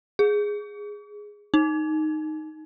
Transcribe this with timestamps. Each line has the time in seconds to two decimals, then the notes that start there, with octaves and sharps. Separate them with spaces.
0.19 G#4
1.54 D#4